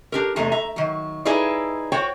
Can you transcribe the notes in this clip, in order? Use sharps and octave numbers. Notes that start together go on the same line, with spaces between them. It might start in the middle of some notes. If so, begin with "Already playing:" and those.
D4 G4 A#4
E2 C3 G#3 A3 A#5
E5 A#5
D#3 F#3
D#4 E4 G#4 B4 D5
F#4 C5 C#5 G5